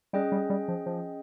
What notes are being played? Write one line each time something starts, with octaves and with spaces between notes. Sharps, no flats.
G3 C#4 G#4 D#5 G5
G3
G3
F3
F3